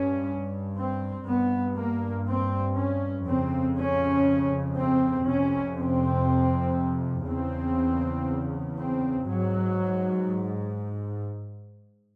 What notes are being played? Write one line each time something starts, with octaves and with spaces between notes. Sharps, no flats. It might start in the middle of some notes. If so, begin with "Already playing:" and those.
Already playing: G2 C#4
C4
G2 B3
A#3
C4
C#4
F2 C#3 C4
C#4
C4
F2 C3 C#4
C4
E2 C#3 C4
C4
G#2 F#3